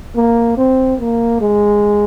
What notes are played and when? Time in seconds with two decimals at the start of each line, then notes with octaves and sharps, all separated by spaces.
0.16 A#3
0.57 C4
1.00 A#3
1.41 G#3